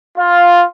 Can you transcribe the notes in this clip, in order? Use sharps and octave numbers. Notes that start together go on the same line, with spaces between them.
F4